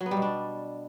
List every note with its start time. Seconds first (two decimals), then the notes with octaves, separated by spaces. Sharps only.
0.01 F#3
0.06 B3
0.11 G3
0.17 B2
0.22 D4